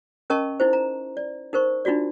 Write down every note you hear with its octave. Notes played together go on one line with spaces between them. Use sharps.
C#4 A#4 D#5 A5 C#6
D#4 E4 C5
A#5
D5
D#4 A#4 C5 C#6
D4 D#4 F4 F#4 D5